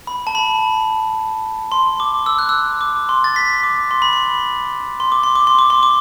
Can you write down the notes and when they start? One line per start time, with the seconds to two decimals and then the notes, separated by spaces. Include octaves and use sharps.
0.07 B5
0.27 A5
0.35 B5
1.72 C6
2.00 D6
2.26 E6
2.39 F#6
2.49 E6
2.81 D6
3.09 C6
3.24 A6
3.36 B6
3.63 D6
3.91 C6
4.02 B5
4.13 C6
5.00 C6
5.12 D6
5.23 C6
5.35 D6
5.47 C6
5.59 D6
5.70 C6
5.83 D6